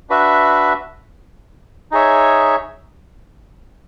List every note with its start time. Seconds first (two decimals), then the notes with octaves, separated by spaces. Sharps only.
0.10 D4 F#4 B4 E5
1.92 D#4 G#4 C#5 E5